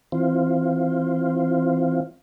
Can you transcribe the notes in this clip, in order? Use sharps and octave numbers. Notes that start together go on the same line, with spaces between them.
E3 C4 F4